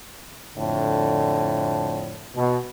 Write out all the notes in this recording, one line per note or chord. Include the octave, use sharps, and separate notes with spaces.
F2 A2 D3
B2